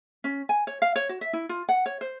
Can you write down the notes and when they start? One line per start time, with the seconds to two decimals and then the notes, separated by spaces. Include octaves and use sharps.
0.24 C#4
0.49 G#5
0.67 C#5
0.82 F5
0.96 C#5
1.09 F#4
1.21 E5
1.33 E4
1.49 F4
1.69 F#5
1.86 C#5
2.01 C5